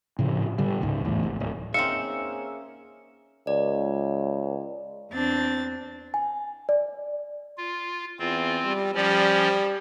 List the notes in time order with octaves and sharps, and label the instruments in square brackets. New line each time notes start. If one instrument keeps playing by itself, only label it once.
[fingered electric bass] A2 C#3 F3
D3 G3
C#2 G#2 C#3
E2 A2
G#1
D1
[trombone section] A#3 C#4 G#4 [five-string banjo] C4 D#4 F5 [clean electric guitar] E5 [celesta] C#7
[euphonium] C#2 [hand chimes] D5
[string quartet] E2 C4 D4 A6
[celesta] G#5
D5
[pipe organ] F4
[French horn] E2 [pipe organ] C4 F4
[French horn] G3
[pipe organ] F3 C#4 D5 [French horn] G3